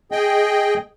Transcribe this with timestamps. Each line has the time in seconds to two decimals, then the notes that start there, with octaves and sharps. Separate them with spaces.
0.12 G#4 D#5 G5